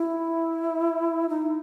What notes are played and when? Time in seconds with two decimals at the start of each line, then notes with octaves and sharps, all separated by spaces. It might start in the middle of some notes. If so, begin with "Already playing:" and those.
Already playing: E4
1.29 D#4